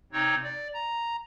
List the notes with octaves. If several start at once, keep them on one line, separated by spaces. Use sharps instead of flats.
C3 C4 D#4 C#5
D5
A#5